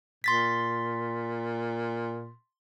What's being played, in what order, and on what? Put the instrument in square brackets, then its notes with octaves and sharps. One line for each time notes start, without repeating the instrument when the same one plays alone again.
[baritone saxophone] A#2 [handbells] C6 A6 B6